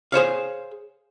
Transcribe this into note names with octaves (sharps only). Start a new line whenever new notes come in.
G#4 C5 C#5 F5